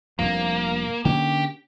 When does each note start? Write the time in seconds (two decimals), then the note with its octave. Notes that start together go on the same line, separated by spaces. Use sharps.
0.19 F1 G2 F3 A#3
1.05 D3 A#3 C#4 G4